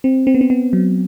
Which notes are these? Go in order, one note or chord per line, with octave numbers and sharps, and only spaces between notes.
C4
C4
B3
C4
B3
F#3